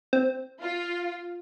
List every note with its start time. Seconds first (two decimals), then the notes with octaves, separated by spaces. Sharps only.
0.13 C4
0.62 F4